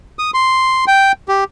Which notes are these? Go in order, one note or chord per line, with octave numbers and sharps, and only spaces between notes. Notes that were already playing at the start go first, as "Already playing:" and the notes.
D#6
C6
G5
G4